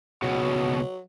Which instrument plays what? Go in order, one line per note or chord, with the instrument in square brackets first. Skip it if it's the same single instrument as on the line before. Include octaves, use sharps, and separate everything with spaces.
[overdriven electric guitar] C#2 B2 [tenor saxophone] F#3